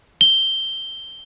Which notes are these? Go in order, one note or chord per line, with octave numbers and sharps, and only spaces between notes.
G7